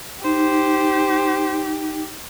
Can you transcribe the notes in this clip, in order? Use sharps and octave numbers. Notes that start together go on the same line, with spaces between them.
D#4 G4 C5